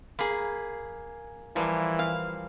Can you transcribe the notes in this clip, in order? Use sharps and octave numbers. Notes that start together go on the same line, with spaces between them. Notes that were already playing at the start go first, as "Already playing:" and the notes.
A#3 G#4 B5
E3 F3 G3 A#3
F5